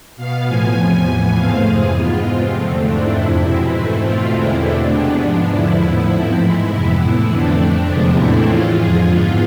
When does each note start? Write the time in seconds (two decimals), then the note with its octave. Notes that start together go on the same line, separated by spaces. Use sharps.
0.17 B2 B3 F5
0.46 A2 F3 B3 G#5
0.76 E2 C3 F3
1.05 A2 E3 B3 G#5
1.35 G#2 F3 A3 C4 F5
1.65 F2 C3 E3 G#4
1.94 G#2 G#3 B3 F4
2.24 C3 G#3 C4
2.53 E2 D3 F3 A3 C4
2.83 G#2 E3 A3 C4 D4
3.13 F2 C3 F3 E4
3.42 B2 G#3 C4
3.72 G#2 E3 A3 C4
4.02 B2 A3 C4 F4
4.31 E2 D3 G#3 C4 E4
4.61 B2 A3 C4 D4
4.91 C3 G#3 B3
5.20 G#2 F3 G#3 B3
5.49 E2 D3 F3 E4
5.80 A2 F3 B3
6.09 G#2 F3 A3 C4
6.39 G#2 E3 G#3 E4
6.69 F2 C3 E3 G#3 B3
6.98 A2 E3 B3 E4
7.27 F2 D3 A3 C4 D4
7.57 F2 D3 A3 C4
7.87 E2 C3 F3 G#3 B3 D4
8.16 A2 E3 A3 C4 E4
8.46 A2 E3 G#3 F4
8.75 F2 D3 F3 G#4
9.05 G#2 E3 B3 F4